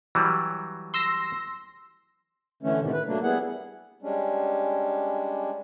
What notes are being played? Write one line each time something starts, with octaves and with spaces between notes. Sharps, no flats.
E3 F#3 G3
C6 E6 A#6
D3 E3 A3 C#4
A2 C3 D#3
B4
F#3 A3 A#3 D4
G3 B3 E4 G#4 F#5
G3 G#3 C#4 D4